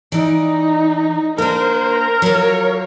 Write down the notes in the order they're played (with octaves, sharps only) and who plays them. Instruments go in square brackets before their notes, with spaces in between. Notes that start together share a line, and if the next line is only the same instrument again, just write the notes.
[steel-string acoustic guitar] E3 D5 [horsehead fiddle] D#4
[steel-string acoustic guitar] A#3 D4 [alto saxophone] A#4 [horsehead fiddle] C5
[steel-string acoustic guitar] F#3 F4 [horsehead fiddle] C#5